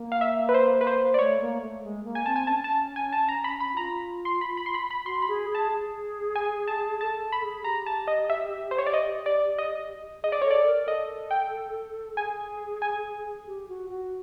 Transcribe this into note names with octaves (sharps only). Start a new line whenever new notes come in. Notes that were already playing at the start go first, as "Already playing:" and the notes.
Already playing: A#3
F5
E5
B4
C5
B4
C5
D5
A3 C#5
A#3
A3
G#3
A#3
G#5
C4 A5
G#5
C#4 A5
A5
G#5
A5
A#5
B5
B5
F4 A#5
C6
B5
B5
C6
B5
B5
F#4 C6
B5
G#4
G#4 A5
G#4
G#5
A5
A4 A5
A4
B5
G#4
G4 A#5
A5
D#5
E5
C5
C#5
D5
D#5
D5
D#5
G#4 D#5
D5
A4 C#5
D5
A#4
A4 D#5
G5
G#4 G#5
G#5
G4
F#4
F#4